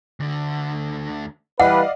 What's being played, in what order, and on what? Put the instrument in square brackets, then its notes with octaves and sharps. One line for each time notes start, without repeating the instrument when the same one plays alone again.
[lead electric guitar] D2 D3
[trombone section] E3 G3 B4 [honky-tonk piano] D5 D#5 F5 [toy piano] F#5